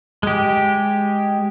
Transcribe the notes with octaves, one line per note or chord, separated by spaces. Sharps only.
G#3 G4